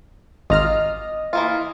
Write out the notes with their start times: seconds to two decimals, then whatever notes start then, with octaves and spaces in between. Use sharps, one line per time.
0.50 G#1 F4 D#5 A#5 F6
1.33 E3 A#3 F4